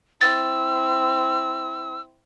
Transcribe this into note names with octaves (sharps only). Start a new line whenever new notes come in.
C4 E4 E6 A6